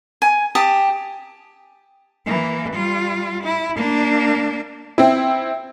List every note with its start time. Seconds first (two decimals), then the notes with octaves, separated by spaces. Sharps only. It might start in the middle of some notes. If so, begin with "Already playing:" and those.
0.22 G#5
0.55 G4 A5 D#6
2.26 E3 A#3
2.74 G3 F4
3.43 E4
3.76 A#3 D4
4.98 C4 E4